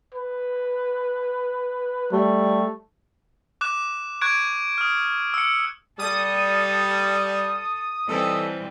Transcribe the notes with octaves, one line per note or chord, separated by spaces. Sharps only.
B4
G3 A3
D6 F#6 E7
C#6 F#6 G#6 D7
D#6 F6
E6 C#7
G3 A4 D#6
E3 G3 C4 D#4 A4